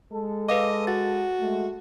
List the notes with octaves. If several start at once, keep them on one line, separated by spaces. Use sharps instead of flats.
G#3 A4
B4 D#5 F5 D6
F#4 A6
G#3 A3